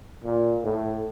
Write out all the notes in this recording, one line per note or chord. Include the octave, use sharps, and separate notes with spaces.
A#2
A2